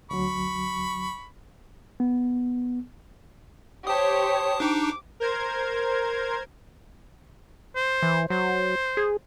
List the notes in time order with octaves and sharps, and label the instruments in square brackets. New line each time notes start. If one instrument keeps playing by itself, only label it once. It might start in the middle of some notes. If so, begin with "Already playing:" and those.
[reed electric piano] D2 F#3 [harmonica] B5 C#6
[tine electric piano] B3
[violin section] G4 C5 C#5 [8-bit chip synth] A5 D#6
[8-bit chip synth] D4 D#4 [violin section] D6
[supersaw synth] A#4 C5 G#6
[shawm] C5
[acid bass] E3
[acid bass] F#3 [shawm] C5
[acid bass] G#4